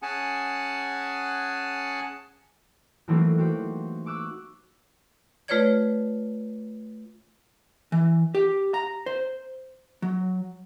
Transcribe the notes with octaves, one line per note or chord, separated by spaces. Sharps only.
C#4 G#4 F#5 G#5 A5
E3 F#3 A3 A#3 C4 D#4
F#4 G4 C5
C#6 D6 E6 F#6
A3 F4 B4 C#5 D5 G#6
E3
G4
A#5
C5
F#3